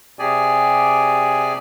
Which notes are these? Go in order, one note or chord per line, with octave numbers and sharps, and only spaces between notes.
C3 G4 G#4 D5 G#5